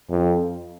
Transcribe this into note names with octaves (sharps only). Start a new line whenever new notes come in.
F2